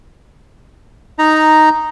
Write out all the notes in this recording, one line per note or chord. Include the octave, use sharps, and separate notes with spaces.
D#4 A#5